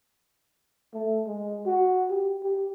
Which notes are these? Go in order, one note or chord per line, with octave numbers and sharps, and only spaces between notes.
A3
G#3
F#4
G4
G4